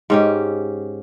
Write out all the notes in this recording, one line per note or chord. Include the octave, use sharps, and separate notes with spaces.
G#2 C#4 G4